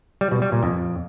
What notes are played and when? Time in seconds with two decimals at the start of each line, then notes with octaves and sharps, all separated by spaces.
0.21 G3
0.31 B2
0.42 G3
0.52 A#2
0.63 F2